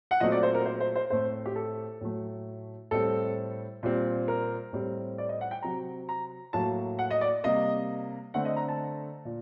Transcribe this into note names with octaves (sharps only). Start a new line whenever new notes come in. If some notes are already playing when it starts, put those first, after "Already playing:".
F#5
A#2 F#3 A3 C4 D#5
D5
C5
A#4
C5
C5
C5
A2 A3 C4 C5
G4
A4
A2 F#3 A3
A2 G3 C4 A4
A#2 G3 C4
A#4
A2 G3 C4
D5
D#5
F#5
G5
C3 F#3 C4 A#5
A#5
A2 F#3 A#3 A5
F#5
D#5
D5
C3 G3 A#3 D#5
D3 A3 C4 F#5
D#5
A#5
A5
A#2